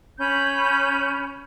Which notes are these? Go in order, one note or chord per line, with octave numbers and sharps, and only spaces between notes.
C#4 B5 G6